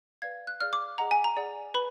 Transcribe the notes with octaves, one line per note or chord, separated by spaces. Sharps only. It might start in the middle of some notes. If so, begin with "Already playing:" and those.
B4 D5 F5 G#6
F#6
G#4 D5 F5 F6
D6
G#4 D#5 F#5 A#5
G#5
A#5
G#4 D5 F#5
B4 B5